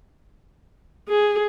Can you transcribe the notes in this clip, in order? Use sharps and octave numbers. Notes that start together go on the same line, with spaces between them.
G#4